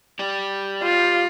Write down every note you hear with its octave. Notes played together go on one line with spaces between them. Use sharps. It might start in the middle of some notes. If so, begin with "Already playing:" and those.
G4 D5
F4